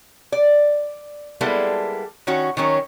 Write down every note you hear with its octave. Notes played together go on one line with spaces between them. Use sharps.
D5
G3 G#3 A#3 B3 E4 A4
D#3 C#4 F#4
D#3 F#3 C#4 A#4